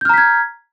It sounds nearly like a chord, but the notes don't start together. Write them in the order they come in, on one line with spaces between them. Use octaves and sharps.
G6 F6 A#5 B6 G#6